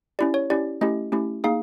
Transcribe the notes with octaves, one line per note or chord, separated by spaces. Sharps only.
C#4 E4 G4 D5
C#5
C#4 E4 G4 D5
A3 C#4 E4 G4 D#5
A3 C#4 E4 G4
A#3 D#4 G#4 F5